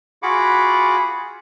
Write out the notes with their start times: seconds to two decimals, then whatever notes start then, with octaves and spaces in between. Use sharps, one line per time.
0.23 F4 F#4 G#4 F#5 B5 D6